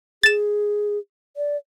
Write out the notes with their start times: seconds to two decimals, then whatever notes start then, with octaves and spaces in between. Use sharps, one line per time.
0.23 G#4 A6 E7
1.37 D5